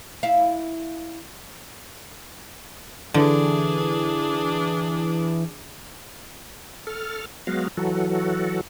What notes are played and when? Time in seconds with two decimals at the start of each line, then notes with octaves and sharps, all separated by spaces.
0.23 E4 F5
3.14 D3 E3 D4 G#4
6.87 A4 F6
7.47 F#3 G#3 B3 F#4 F5
7.77 E3 F#3 F#4 A4